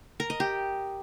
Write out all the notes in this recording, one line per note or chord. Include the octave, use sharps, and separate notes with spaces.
A#4
D#5
G4